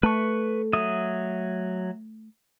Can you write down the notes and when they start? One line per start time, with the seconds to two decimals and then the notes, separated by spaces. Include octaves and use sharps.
0.03 A3 B4 C#6
0.73 F#3 E5 D#6